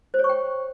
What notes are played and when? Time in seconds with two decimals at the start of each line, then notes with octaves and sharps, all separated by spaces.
0.14 C5
0.19 C#5
0.24 C#6
0.29 G5